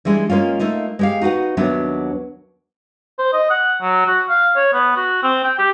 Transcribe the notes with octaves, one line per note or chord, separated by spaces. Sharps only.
E3 G3 G#3 D4
G#3 A#3 C#4 F4
A3 A#3 D#4 F4
G#3 G4 F5
D#4 F#4 B4 F#5
D#2 F#3 B3 D4 E5
C5
D#5
F#5
F#3
F#4
F5
C#5
B3
F#4
C4
G5
G4